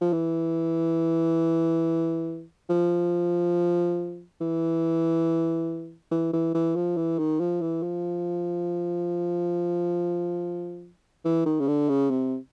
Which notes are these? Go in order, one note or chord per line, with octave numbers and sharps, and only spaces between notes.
F3
E3
F3
E3
E3
E3
E3
F3
E3
D#3
F3
E3
F3
E3
D#3
C#3
D3
C#3
C3